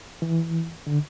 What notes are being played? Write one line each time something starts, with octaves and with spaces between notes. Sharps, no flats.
E3
D3